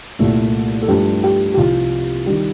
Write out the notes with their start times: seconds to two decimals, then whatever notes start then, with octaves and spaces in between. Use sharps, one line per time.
0.19 C2 A#2 A3
0.82 A4
0.88 G2 F3 A3 G4
1.24 G4
1.54 G4
1.57 C2 C3 F3 F4
2.26 D#3 G3